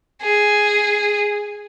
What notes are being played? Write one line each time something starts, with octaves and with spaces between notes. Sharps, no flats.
G#4